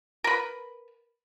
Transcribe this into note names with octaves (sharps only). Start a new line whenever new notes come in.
A#4 B4